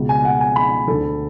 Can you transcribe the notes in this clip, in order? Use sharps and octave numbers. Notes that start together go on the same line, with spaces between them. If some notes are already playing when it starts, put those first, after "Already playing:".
Already playing: C#2 B2
G#5
F#5
G#5
B5
D2 D3 A4